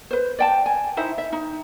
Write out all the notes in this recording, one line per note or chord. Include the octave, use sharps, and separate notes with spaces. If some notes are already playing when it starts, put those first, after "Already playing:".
B4 C5
D5 G5 A5
G#5
D#4 E4 C5 E5
E5
D#4